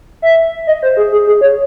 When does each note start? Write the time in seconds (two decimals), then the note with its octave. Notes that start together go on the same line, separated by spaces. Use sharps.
0.22 E5
0.67 D#5
0.83 C5
0.97 G#4
1.12 G#4
1.27 G#4
1.41 C#5